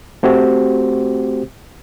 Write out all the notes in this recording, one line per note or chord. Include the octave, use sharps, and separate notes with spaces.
A3 C4 F#4 G4 C5